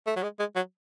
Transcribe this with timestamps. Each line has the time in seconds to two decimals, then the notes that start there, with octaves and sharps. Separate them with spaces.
0.07 A3
0.16 F#3
0.23 G#3
0.39 G#3
0.56 F#3